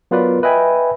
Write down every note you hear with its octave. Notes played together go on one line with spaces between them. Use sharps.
F#3 B3 F4 A#4 B4 D5
B4 D#5 E5 G5 G#5 B5